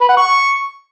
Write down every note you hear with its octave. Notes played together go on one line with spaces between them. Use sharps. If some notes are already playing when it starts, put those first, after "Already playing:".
B4
F#5
C#6